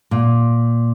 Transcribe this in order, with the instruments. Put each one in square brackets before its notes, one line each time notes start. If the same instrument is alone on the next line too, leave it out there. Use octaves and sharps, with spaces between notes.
[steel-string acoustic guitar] A#2